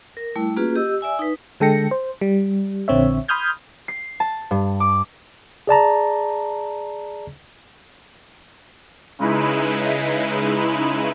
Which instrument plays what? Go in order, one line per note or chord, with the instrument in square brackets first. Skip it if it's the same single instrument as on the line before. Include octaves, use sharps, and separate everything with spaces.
[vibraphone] A#4
G3 A3 E4
A#3 C#4 F4 F#4 G#4 B4
G4 D#5 E6
D5 E5 G#5 E6
D#4 B4
[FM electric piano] D3 G#3 A4 G5 A#6 C#7
C5
G3
A#1 D3 C4 C#5 E5
B5 C6 D#6 F6 G6 G#6
[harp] C7
A5
G2
D6
[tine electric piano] G#4 D5 A5 A#5
[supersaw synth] C#3 G#3 D#4 E4 B4